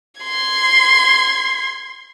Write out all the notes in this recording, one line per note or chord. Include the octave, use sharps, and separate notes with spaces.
C6 G#6